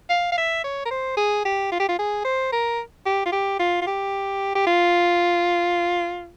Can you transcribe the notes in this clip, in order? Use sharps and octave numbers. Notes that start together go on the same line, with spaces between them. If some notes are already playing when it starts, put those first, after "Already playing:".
F5
F5
E5
C#5
A#4
C5
G#4
G4
F4
G4
F4
G#4
C5
A#4
G4
F4
G4
F4
F4
G4
G4
F4